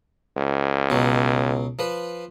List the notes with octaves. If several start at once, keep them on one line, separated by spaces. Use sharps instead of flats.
C#2
B2 F#3
F3 B4